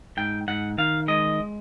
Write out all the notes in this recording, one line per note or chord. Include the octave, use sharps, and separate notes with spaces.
G#2 G5
G#2 F#5
D#3 F5
G#3 D#5